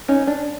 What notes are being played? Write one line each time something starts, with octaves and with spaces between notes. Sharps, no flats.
C#4 D#4
D4